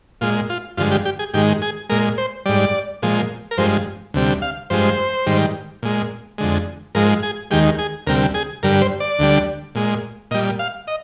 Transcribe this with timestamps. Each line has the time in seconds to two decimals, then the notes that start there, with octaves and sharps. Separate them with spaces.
0.21 A#2 G#3 F4
0.49 F4
0.77 G2 D3 F3 G#3 F4
0.92 G4
1.05 G4
1.19 G#4
1.34 G#2 D#3 G#3 G4
1.62 G#4
1.89 A#2 G#3 A#4
2.18 C5
2.46 G#2 G3 D5
3.02 A#2 F3 G#3
3.51 A#4
3.58 G2 F3 G#3 C5
4.14 D2 C3 G3
4.42 F5
4.70 G2 F3 G#3 C5
5.26 G#2 D#3 G3
5.83 A#2 G#3
6.38 F2 D3 G#3
6.95 G#2 F3 G#3 A#4
7.23 G#4
7.51 D#2 D#3 G#3 G4
7.78 G#4
8.07 D2 C3 G3 A#4
8.34 G#4
8.63 G2 D3 G3 A#4
8.81 C5
9.00 D5
9.19 D2 D3 G3
9.75 A#2 G#3
10.31 A#2 G3 D#5
10.59 F5
10.87 D#5